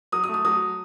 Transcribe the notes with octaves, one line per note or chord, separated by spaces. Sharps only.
F#3 D#6
D#6
A3
D#6
F#3 D#6